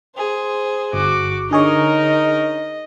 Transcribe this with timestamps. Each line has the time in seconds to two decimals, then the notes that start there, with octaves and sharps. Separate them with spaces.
0.16 G#4 C5
0.93 G1 F#4 D6
1.51 D3 D#4 G#4 A#4 C#5 D#5